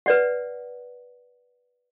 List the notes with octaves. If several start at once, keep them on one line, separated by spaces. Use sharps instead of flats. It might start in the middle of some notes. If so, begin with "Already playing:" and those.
B4 D5 F#5